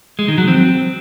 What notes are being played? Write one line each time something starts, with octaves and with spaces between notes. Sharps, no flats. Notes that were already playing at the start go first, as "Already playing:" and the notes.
G#3
D#3
F#3
C4